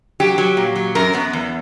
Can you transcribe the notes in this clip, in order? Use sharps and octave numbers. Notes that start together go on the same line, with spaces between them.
F#3 G4
F#3
A#2
F#3
F#2 A#4
F#2 B3
E2